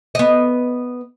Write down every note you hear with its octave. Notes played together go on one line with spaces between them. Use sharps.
B3 D#5